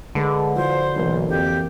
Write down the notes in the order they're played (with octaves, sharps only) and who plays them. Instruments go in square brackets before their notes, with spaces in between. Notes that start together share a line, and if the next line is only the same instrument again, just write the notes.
[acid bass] D3 [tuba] G#3 [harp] B4 C#5
[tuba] F3 [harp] E4 F#4 [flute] C5
[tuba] B1 [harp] E3 A#3
[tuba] F2 [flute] G4